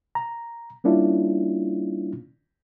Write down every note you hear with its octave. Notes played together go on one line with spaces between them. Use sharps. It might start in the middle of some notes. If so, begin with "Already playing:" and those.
A#5
G3 A#3 C#4 D4 E4 F4